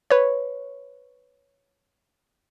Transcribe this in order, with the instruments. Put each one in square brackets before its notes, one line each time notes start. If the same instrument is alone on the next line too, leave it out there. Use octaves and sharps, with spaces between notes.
[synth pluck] B4 C#5